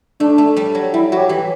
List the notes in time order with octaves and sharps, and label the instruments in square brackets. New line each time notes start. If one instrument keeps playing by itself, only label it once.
[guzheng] A3 [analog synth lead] D4
[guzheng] A3
G3
F#3
[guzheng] G3 [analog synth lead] E4
[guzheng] F#3 [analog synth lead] F#4
[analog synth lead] G4
[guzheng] E3